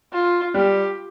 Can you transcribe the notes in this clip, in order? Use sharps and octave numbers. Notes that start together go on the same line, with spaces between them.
F4
G3 G4